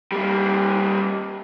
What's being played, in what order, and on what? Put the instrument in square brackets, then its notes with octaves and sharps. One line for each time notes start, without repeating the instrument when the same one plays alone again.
[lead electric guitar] G3 A#3